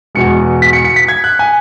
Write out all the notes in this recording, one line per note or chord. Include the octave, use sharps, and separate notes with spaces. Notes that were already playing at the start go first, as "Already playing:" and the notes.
E2 B2 G#3 C#7
B6
C#7
C#7
B6
G#6
F#6
G#5